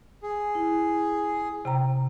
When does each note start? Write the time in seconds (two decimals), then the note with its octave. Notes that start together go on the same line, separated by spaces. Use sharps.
0.23 G#4
0.55 E4
1.65 C3 G5 A#5